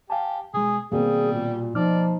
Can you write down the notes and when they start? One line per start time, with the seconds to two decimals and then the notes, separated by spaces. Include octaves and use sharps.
0.10 G4 F5 G#5 A5
0.54 B2 G#3 G#4
0.92 B2 D#3 G3 A#3 C4 G#4
1.32 A#2
1.75 F3 D#4 D5 F6